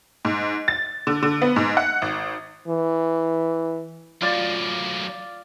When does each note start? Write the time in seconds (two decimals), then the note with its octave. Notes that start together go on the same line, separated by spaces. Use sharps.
0.25 G#2
0.68 A6
1.07 D3
1.23 D3
1.42 B3
1.56 G#2
1.77 F#5
2.02 G#1
2.68 E3
4.22 F#2 A2 F4 D5